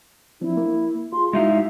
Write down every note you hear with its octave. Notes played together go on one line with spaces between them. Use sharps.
F3 C4 D4 E4
A#3
F4 G#4 C6
G#3 D#4 E4 F#4 E5 F5